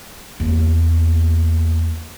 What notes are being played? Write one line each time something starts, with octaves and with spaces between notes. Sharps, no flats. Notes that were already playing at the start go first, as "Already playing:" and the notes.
E2 A#3